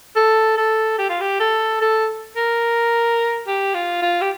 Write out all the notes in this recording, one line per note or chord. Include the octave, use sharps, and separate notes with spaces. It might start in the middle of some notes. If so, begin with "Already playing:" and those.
A4
A4
G4
F4
G4
A4
A4
A#4
G4
F4
F4
G4